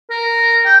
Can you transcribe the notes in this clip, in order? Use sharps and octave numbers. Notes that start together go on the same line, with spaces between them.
A#4
G5